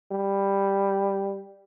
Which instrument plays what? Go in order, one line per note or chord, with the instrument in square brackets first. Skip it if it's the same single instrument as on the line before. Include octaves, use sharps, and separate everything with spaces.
[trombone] G3